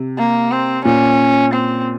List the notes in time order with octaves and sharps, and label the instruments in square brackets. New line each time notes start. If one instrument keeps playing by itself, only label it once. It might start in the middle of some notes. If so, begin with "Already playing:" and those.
Already playing: [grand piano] C3
[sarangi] A#3
C4
[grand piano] A#2 [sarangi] C#4
[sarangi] C4